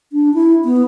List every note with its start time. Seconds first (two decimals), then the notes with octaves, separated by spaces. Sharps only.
0.12 D4
0.34 E4
0.64 B3